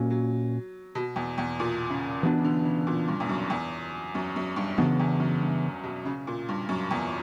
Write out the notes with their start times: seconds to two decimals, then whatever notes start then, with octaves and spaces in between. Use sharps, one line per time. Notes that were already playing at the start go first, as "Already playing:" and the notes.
Already playing: A#2 F#3 A#3 C#4
0.10 F#3
0.95 B2
1.16 E2
1.38 E2
1.60 A#2
1.90 C#3
2.23 B2 E3 B3 D4
2.38 C#3
2.44 D3
2.65 C#3
2.87 A#2
3.08 G2
3.20 E2
3.29 F#2
3.50 E2
4.15 F#2
4.36 F#2
4.56 G2
4.78 F#2 C#3 E3 B3 D4
5.00 E2
5.20 F#2
5.41 G2
5.84 B2
6.05 C#3
6.27 A#2
6.49 G2
6.69 F#2
6.91 E2